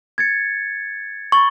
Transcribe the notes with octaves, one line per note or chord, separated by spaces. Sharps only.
G#6 A6 C#7
B5 C#6 A6 G7